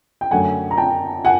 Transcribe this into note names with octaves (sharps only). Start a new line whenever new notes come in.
G5
F#2 D3 F#3 A3 F#5 G#5
A#5
G5 A5
F#5 G#5